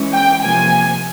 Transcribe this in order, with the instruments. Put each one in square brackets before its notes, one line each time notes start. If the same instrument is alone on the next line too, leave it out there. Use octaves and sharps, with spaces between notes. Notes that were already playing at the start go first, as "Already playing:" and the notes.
Already playing: [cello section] E3 G#3 C#4
[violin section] G5
[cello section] C3 F3 A#3 [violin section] G#5